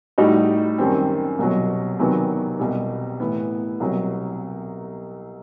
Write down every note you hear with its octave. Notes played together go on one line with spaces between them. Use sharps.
A2 G3 D#4 F#4
F#2 D#3 G3 C4
C2 B2 F#3
E2 C3 D#3 F#3 B3
C2 B2 G3
A2 E3 B3 E4
C2 B2 F#3